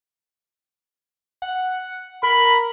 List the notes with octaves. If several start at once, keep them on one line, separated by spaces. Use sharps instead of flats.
F#5
A#4 B5